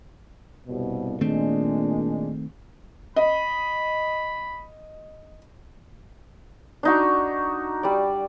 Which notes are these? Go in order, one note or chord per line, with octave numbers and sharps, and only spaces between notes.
C2 G2 B2
A#2 D#3 G#3 A3 C4 D4
D#5 B5
D4 D#4 F#4
G3 D5